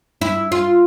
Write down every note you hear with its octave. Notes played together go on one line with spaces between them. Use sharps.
E4
F4